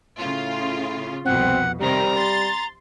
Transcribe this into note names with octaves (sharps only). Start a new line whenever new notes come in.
A2 C#3 F4
C2 F2 B2 C4 F#5
C3 D#3 G3 C4 A#5
C6 A6